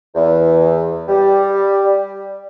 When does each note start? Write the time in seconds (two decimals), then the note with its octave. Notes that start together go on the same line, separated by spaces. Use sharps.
0.15 E2
1.08 G3